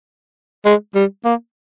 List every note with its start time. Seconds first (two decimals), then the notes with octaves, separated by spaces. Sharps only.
0.65 G#3
0.95 G3
1.25 A#3